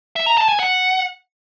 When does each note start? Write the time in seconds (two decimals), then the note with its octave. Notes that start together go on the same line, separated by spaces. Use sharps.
0.16 E5
0.27 A#5
0.38 A5
0.48 G#5
0.59 F#5